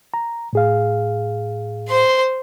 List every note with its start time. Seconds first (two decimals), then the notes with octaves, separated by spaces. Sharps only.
0.14 A#5
0.53 A2 G#4 F5
1.89 C5 C6